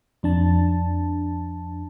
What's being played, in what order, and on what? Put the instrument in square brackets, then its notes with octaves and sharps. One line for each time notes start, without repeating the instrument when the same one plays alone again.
[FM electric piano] F2 D4 A5